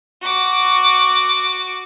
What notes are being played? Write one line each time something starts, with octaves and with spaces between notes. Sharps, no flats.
F#4 D6